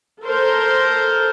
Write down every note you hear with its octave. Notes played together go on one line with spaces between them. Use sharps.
A4 A#4 C5